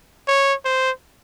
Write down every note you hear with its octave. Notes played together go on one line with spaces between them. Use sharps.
C#5
C5